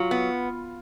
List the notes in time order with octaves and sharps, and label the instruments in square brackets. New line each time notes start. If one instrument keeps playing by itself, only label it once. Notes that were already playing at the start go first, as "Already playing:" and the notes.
Already playing: [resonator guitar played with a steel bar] F#3 [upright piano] F4
[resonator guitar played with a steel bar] B3